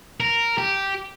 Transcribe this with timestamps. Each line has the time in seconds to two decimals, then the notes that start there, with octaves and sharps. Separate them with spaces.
0.20 A#4
0.58 G4